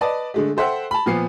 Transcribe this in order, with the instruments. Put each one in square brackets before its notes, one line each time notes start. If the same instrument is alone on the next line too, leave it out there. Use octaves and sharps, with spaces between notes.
[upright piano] B4 D5 D#5 A5
D3 G#3 A3
A4 C5 E5 F#5 G5
A5 B5
A#2 F3 B3 B4 C7